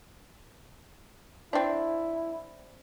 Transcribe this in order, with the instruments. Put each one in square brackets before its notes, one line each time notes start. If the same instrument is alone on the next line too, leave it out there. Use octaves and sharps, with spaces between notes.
[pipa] C4 D4 [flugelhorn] E4